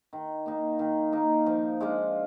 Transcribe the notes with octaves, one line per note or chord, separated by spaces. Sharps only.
D#3
A#3 D#4
D#3
A#3 D#4
F3
G#3 D4 F4